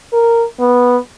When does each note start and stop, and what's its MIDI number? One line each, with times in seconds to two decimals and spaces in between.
0.13 0.45 70
0.59 0.97 59